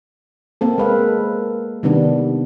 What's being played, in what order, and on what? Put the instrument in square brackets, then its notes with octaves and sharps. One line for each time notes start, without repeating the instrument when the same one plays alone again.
[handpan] A#3 C4 A4
G#3 B4 F5
C3 D#3 G3 B3 D4